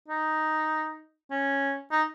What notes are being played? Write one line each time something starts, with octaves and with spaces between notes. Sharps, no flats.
D#4
C#4
D#4